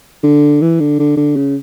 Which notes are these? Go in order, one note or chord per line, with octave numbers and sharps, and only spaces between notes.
D3
E3
D3
D3
D3
C#3